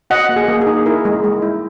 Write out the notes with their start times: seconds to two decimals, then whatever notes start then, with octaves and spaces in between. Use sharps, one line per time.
0.10 F#4 D#5 F#5
0.29 A#3
0.36 G#4
0.48 A#3
0.61 G#4
0.67 D#4
0.86 E4 A#4
1.05 G#3
1.24 G#3
1.42 E4